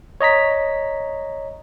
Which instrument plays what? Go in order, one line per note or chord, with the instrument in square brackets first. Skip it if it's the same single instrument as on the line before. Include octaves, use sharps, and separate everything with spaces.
[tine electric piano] C#5 D#5 A#5 B6